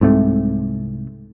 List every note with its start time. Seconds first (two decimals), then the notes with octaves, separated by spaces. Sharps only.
0.01 C2 G#2 C3 A3